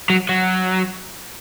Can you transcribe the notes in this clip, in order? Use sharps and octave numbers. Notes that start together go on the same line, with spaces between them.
F#3
F#3